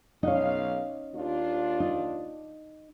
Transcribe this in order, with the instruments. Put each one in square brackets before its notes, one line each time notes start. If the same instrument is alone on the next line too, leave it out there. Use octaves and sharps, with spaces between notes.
[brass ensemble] B1 F5 [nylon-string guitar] C#4 D#4
[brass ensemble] D#2 D4 F4
[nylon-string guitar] D#4